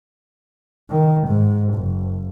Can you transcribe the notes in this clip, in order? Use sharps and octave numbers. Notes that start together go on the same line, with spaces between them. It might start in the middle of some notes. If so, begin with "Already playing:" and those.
D#3
G#2
F#1